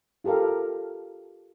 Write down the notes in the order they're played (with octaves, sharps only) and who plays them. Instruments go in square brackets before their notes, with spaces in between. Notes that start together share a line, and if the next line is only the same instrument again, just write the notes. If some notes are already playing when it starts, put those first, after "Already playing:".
[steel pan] F4 G4 A4 A#4 F5